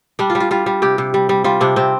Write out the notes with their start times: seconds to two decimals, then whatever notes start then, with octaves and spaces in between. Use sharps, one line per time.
0.19 G3 D4
0.30 F4
0.35 G3
0.40 F4
0.51 G3 F4
0.66 G3
0.82 C3 G4
0.98 C3
1.14 G3
1.29 G3
1.44 G3 F4
1.61 C3 D4
1.76 C3 C4